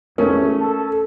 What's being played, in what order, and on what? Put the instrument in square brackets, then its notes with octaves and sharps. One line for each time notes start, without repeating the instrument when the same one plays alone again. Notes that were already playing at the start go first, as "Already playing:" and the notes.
[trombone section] G#1 E2 [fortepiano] A3 C#4 [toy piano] A#4
[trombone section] A4